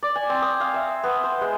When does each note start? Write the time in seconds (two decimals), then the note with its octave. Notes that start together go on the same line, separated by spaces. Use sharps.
0.03 D5
0.16 G#5
0.29 C4
0.42 D#6
0.60 F5
0.74 E5
1.04 B3
1.24 C5
1.41 G#3